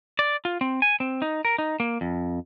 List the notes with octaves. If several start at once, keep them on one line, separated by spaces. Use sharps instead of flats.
D5
F4
C4
G#5
C4
D#4
A#4
D#4
A#3
F2